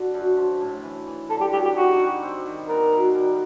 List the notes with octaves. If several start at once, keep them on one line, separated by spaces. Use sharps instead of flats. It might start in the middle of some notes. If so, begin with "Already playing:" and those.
Already playing: D3 F#4
F#2
F3
A2
E3
E3
D3 A4
G4
F#3 G4
G4
D#4 F#4
G3
C4
D#3
B3 A#4
B2
G3